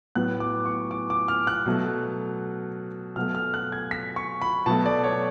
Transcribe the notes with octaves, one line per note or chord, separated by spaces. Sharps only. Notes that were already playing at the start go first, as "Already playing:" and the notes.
A2 F#3 B3 F#6
D6
C#6
D6
D6
F6
F#6
B2 F#3 A3
B2 F#3 A3 F6
F6
F#6
G#6
B6
C#6
B5
B2 F#3 A3 A5
D5
C#5